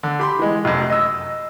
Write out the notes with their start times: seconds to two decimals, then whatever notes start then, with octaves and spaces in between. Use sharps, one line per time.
0.03 D3
0.19 G4 B5 C6
0.39 E3 G#3
0.65 F1 F#2
0.90 D#5 E6